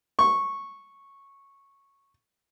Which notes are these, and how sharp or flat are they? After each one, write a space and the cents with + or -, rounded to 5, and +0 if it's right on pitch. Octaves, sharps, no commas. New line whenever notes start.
C#6 -10